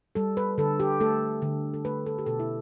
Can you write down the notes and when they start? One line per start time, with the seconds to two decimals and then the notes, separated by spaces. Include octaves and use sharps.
0.15 G3 A4
0.37 B4
0.58 D3 A4
0.80 G4
1.00 A3 A4
1.42 D3
1.74 A4
1.85 A3 B4
2.06 A4
2.18 G4
2.26 B2 A4
2.40 E4